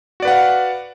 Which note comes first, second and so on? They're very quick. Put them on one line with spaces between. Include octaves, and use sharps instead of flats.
F#4 D5 B4 F#5 F5